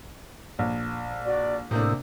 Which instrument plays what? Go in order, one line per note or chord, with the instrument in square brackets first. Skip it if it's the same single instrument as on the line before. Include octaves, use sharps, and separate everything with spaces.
[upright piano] A#1
[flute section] F#4 D5
[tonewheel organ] A2 [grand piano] C3 A#3 D4 [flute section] D#6 E6 G6